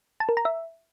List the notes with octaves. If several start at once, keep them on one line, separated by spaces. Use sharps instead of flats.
A5
A#4
A#5
E5